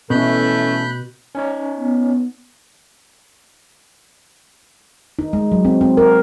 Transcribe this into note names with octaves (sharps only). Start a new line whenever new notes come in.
B2 E3 A3 C#4 A4 B5 F#6 G6
C#4 D#4 C#5
B3
D#4
G#3
F#3
C4
C4
A#4